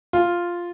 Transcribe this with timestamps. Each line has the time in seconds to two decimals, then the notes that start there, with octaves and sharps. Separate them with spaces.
0.13 F4